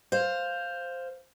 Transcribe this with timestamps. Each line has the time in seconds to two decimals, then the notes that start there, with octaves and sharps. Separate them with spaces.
0.12 C5 F5